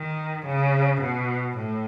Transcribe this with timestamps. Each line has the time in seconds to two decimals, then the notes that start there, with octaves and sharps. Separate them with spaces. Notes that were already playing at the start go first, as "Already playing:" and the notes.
Already playing: D#3
0.46 C#3
1.01 B2
1.56 A2